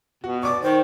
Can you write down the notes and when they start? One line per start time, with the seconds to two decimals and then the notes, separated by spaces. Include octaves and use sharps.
0.24 B2 F#4
0.43 D5 C#6 D6
0.62 D#3 C5